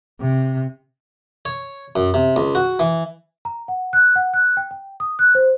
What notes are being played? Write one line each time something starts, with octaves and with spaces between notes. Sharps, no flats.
C3
C#5
F#2
C3
C#2
F#4
E3
A#5
F#5
F#6
F#5
F#6
G5
G5
D#6
F#6
C5